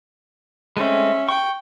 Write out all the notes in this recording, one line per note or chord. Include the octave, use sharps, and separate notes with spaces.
G#3 A3 C4 C#4 E5
G5 C#6